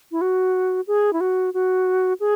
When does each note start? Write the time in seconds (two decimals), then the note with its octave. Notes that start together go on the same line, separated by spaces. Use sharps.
0.12 E4
0.21 F#4
0.87 G#4
1.13 E4
1.21 F#4
1.54 F#4
2.20 G#4